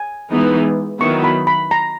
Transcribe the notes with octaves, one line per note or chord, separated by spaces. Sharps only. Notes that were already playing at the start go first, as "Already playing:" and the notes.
Already playing: G#5
E3 G#3 B3 D#4
D#3 F#3 B3 E4 C#6
B5
B5
A#5